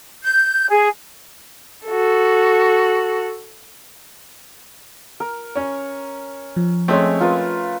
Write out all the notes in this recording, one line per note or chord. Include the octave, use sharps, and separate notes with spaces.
G6
G#4
F#4 A4
A#4
C#4 C#5
F3
G#3 A3 C4 C#4 C#5
F4 A#4 B4